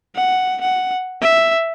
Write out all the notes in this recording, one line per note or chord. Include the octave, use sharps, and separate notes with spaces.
F#5
F#5
E5